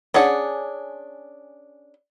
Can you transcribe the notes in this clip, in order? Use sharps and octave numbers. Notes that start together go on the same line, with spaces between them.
C#4 D4 G#4 F#5